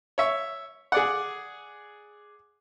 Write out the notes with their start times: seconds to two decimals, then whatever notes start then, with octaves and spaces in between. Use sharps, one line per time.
0.18 C#5 E5
0.92 G#4 D5 F#5